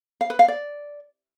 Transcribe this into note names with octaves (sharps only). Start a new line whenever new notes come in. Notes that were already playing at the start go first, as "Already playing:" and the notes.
F5
B4
F5
D5